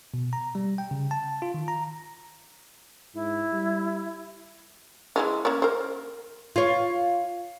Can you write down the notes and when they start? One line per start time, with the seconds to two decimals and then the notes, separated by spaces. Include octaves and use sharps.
0.14 B2
0.33 A#5
0.55 G3
0.78 G5
0.91 C#3
1.11 A5
1.42 F4
1.54 D#3
1.68 A#5
3.14 G#2 E4
3.52 G3
5.16 E3 G#3 C#4
5.45 A#3 C#4 C#5
5.62 A#4 C5
6.56 F4 C#5